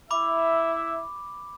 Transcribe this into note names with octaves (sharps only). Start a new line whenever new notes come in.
E4 E5 B5 D6